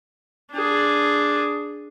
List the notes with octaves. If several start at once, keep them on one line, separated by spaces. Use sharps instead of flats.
D4 G#4